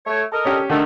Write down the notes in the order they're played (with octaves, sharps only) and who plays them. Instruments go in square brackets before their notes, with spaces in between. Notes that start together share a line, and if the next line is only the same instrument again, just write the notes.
[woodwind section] A3 C#5
A4 A#4 D#5
[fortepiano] C#4 G4
[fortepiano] D3 [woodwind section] D#3 A3